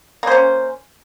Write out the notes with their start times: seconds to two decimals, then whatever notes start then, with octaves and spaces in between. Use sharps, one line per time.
0.23 A#3
0.27 C5
0.32 C#4